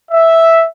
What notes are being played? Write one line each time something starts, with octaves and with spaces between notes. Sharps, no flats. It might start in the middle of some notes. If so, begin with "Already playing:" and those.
E5